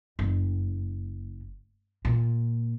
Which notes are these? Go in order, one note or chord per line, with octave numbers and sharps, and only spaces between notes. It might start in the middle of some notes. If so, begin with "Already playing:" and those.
F#1
A#2